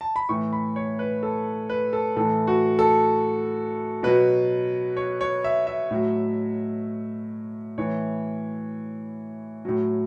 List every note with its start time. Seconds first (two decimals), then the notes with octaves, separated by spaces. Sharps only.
0.01 A5
0.16 B5
0.29 A2 E3 C#6
0.53 B5
0.76 C#5
0.99 B4
1.23 A4
1.69 B4
1.93 A4
2.16 A2 E3 A4
2.47 F#4
2.79 A4
4.03 B2 F#3 B4
4.97 C#5
5.21 C#5
5.44 E5
5.67 E5
5.91 A2 F#3
7.78 A2 E3 C#5
9.65 A2 F#3